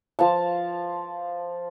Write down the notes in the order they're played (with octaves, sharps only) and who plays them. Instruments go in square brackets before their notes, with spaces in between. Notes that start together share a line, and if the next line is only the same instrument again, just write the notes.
[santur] F3 F5 A5